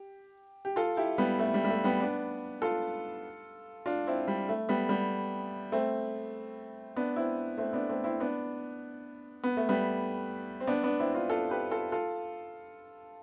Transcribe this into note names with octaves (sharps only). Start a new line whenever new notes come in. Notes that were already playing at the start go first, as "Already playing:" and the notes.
Already playing: G4
G4
F4 A4
E4 G4
G3 B3
A3
G3
G3
A3
G3 B3
B3 D4
F4 A4
D4 F4
C4 E4
G3
A3
G3 B3
G3 B3
A3 C4
B3 D4
C4 E4
A3 C4
B3 D4
A3 C4
C4 E4
B3 D4
B3
A3
G3 B3
C4
B3 D4
B3 D4
C4 E4
D4 F4
F4 A4
G4 B4
F4 A4
F4 A4